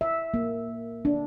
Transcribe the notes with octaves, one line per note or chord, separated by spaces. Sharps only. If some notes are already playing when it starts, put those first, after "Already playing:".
E5
A#3
D4